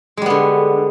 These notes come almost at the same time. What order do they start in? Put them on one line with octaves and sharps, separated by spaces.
G#3 G3 B3 D3